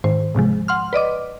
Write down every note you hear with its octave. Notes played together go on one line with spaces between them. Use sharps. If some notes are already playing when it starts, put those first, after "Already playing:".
G#2 D#3 C5
G#2 C3 F3 G#3
F#5 C6 F6
B4 D5 D#5 D6